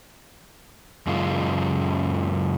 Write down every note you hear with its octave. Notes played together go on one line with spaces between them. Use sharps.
F#2 C#3 G#3 F4